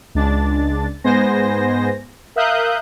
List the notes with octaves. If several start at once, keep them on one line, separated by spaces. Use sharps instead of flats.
C#2 G#3 D4 A6
G#2 G#3 B3 C5 G#5 A#6
A#4 E5 F5 D#6 F#6 G6